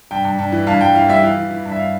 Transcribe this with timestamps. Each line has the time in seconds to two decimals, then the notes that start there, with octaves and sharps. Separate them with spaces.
0.11 G2 G5
0.25 G2
0.39 G2
0.52 E3
0.67 G2 F5
0.81 G2 G5
0.95 E3 F5
1.09 G3 E5
1.23 E3 F5
1.37 E3
1.51 E3
1.66 G2
1.72 E5
1.79 F5